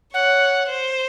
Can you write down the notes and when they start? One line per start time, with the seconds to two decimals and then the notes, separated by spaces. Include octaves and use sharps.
0.13 C#5 F#5
0.69 C5